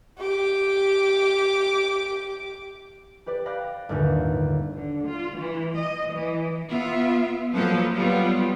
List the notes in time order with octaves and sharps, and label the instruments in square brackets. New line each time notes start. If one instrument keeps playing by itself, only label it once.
[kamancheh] G4 D6
[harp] G4 B4 D5
D5 F5 G5 B5 F#6 A#6
G1 D#2 A2 D3
[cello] D3
F4
E3
D#5
E3
[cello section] B3 F4 E5
F3 F#3 A#3 A4 B4
F#3 G3 B3 F4